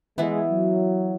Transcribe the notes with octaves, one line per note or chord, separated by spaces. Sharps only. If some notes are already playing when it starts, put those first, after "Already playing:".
E3 G#3 B3 E4
F#3